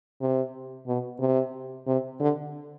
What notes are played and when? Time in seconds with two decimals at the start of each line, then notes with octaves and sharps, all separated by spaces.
0.21 C3
0.87 B2
1.20 C3
1.87 C3
2.20 D3